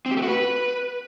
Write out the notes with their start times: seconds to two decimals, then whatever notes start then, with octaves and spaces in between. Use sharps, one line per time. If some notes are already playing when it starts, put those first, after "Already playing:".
0.06 C4
0.11 G4
0.17 A3
0.22 F#4
0.28 B4